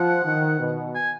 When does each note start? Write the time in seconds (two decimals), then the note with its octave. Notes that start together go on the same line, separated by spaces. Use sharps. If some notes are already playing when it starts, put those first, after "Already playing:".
Already playing: F3 F#5
0.25 D#3
0.59 B2
0.95 G#5